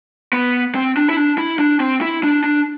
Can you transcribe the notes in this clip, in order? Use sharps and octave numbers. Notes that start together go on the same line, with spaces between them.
B3
C4
D4
E4
D4
E4
D4
C4
E4
D4
D4